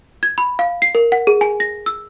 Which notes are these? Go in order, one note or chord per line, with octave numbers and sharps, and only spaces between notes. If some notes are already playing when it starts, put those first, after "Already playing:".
G#6
B5
F5
C7
A#4
F#5
G#4
G#5
A#6
E6